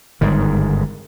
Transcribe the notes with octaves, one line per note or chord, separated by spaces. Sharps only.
G1 G#2 D#3